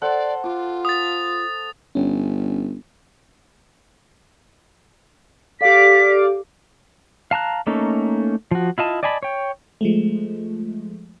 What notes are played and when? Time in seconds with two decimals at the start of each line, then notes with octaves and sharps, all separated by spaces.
0.02 A4 C5 D5 F#5
0.44 F4 D6
0.85 D#6 A6
1.95 G1 C#4
5.61 G4 A4 D5 F5 D6 B6
7.31 F5 A5 A#5 F#6
7.67 A3 A#3 C#4 D#4 A4
8.51 F3 F#4
8.78 E4 F4 D#5 A5
9.03 D5 D#5 G#5 A5 B5
9.23 C#5 G5
9.81 F3 G#3 A3